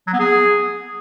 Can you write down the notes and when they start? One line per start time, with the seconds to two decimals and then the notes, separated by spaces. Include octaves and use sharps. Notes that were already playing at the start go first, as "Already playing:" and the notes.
0.07 F#3
0.13 B3
0.19 G#4